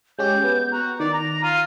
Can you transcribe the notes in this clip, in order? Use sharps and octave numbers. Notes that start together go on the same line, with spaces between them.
G#3 C#4 G4 G6
B3
F#4 A#5
D#3 D5
A#5 A#6
F4 D#7